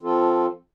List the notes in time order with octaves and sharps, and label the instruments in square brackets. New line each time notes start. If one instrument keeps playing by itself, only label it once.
[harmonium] F3 C4 F4 A4